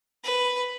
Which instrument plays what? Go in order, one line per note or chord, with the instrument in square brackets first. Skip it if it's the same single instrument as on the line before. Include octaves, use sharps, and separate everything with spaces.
[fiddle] B4